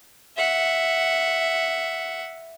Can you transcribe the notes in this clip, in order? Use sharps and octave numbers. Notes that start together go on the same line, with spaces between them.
E5 F#5